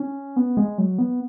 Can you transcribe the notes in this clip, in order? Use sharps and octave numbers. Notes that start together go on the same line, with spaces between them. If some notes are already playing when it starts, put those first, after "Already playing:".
Already playing: C#4
B3
G#3
F#3
B3